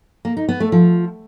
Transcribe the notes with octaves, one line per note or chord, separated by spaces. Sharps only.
A#3
D#4
B3
A3
F3